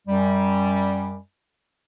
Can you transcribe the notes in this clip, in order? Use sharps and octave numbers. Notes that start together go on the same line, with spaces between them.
F#2 G3